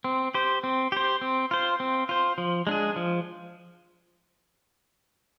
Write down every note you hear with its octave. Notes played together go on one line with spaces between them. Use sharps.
C4
G4 C5
C4
G4 C5
C4
F4 C5
C4
F4 C5
F3
G#3 D4 G#4
F3